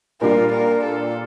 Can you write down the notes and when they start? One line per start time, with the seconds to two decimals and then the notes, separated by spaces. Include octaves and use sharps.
0.21 A#2 G3 D4 F4 A#4
0.52 A#4
0.84 A4